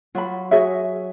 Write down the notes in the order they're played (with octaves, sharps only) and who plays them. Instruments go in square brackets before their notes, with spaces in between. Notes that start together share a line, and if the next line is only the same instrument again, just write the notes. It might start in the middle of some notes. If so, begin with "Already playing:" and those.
[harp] F#3 [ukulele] F4 B5
[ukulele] F#4 G#4 E5 [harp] C#5